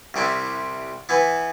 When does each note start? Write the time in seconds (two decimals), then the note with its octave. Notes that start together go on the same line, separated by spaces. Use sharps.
0.14 C2 C3 G3 C4 E4
1.09 E3 B3 E4 B4